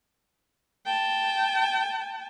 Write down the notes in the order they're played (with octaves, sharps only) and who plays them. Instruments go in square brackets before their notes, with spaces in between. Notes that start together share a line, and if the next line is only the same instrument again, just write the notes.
[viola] G5 A5